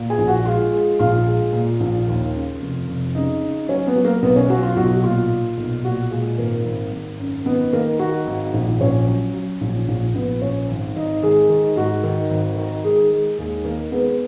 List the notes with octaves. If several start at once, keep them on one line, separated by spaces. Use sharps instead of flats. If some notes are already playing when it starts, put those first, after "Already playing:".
Already playing: A#2
G#4 G#5
A#1
F#4 F#5
G#3 F4 F5
G#3
A#1 F4 F5
G#3
A#2
A#1
D#2
C#3
F1
F1
C#3 D#4 D#5
C#3
F#3 C#4 C#5
B3 B4
F#3
A#3 A#4
B1 B3 B4
C#4 C#5
F#3 F#4
F4
B1 F#4
F#4
A#2 F4
A#2
B1
A#2 F#4
A#2 G#3 G#4
G#1 A#3 A#4
G#1
G#1
F#2
D#3 B3 B4
D#3 A#3 A#4
D#3 F#4
G#1
A#1
A#1 C#4 C#5
F#3
F#3
A#1
A#1
A#1 B3 B4
A#1 C#4 C#5
G#1
G#1 D#4 D#5
D#3 G#3 G#4
D#3
G#2 F#4
D#3
G#1
D#3
D#3 G#3 G#4
G#3
D#2 G#3 G#4
D#3 A#3 A#4
G#3 B3 B4